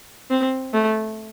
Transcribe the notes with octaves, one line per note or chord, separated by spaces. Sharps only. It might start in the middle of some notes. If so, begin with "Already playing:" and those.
C4
A3